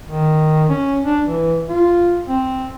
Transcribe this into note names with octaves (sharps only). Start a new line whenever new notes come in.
D#3
C#4
D4
E3
F4
C4